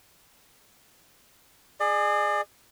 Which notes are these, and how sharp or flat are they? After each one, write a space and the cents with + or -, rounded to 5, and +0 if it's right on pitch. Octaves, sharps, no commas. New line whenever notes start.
G#4 +0 D5 +40